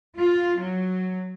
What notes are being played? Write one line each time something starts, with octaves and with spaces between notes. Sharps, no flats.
F4
F#3